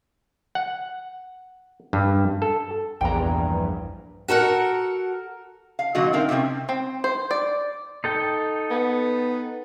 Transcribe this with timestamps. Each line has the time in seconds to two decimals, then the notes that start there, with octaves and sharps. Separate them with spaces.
0.55 F#5
1.93 G2
2.42 A4
3.01 A#1 E2 G2 G5 A#5
4.28 F#4 A4 A#4 F#5
5.79 F5
5.95 A#2 D3 F#3 F#4 D#5
6.13 A3 C4 D#4 A#4 F5
6.29 C3 D#3 F#3 C4 C#4
6.69 C4
7.04 C5
7.31 D5
8.04 D#4 A4 G5
8.70 B3